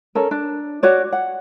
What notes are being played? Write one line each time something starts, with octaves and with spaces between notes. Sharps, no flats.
C#4 A4 A#4
D4
F#4 C#5 D5
F#5